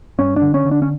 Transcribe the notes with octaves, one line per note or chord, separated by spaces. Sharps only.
G2 C#4
D4
D3
C#4
D3
D4
C#4